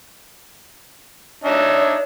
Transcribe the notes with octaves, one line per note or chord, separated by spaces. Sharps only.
D4 D#4 C#5 E5